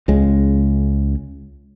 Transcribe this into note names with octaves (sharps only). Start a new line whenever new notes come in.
C#2 C#3 G#3